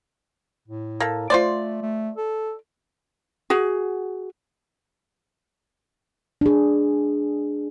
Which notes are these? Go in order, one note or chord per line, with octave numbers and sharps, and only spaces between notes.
A2
A#3 A4
A3 F4 C5 D5
A3
A4
F#4 G#4
D4 G#4